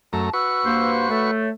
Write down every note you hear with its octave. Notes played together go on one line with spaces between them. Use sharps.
F#2 A3 A5 A#5
F#4 B4 C#6 E6
G2 A#3 C5
A3 C#5